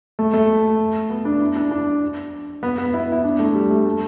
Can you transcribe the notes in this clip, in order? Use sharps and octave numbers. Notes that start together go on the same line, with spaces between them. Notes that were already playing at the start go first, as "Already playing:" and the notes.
A3
A3
B3
D4
E4
D4
D4
B3
B3
E4
E4
D4
A3
G3
A3
A3